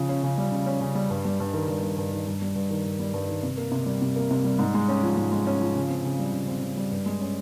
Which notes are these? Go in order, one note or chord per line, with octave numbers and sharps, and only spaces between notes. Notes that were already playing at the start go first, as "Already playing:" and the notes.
Already playing: C#3 F3
C#4
C#3
G3
C#3
C#4
C#3
G3
G2
G3
G2
D#3
G2
G3
G2
D#3
G2
G3
G2
D#3
G2
G3
G2
D#3
C3
A#3
C3
G3
C3
A#3
C3
G3
G#2
G#3
C#4
F3
G#2
G#3
C#4
F3
C#3
C4
C#3
G3
C#3
C4
C#3
G3
G2
G#3
C#4